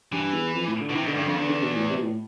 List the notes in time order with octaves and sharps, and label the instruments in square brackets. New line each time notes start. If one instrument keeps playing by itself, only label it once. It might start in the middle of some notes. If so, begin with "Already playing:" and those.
[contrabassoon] G2 [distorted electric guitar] E3
[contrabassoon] E2
F2
A2
D3
[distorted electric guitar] B2
[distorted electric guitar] C3 [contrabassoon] E3
[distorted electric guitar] B2
[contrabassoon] D3
[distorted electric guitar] G2
[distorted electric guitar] F2 [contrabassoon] D3
[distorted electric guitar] E2 [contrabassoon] D3
[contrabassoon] D3
B2
A2
C3
B2
A2